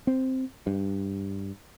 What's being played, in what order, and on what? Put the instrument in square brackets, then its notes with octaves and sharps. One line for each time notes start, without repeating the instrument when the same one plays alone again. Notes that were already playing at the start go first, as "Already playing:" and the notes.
[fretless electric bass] C4
G2